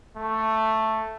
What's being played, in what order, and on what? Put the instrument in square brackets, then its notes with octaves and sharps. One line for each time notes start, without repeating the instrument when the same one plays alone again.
[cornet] A3